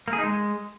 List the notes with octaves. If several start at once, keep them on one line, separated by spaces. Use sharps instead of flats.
A#3
G#4
D#4
G#3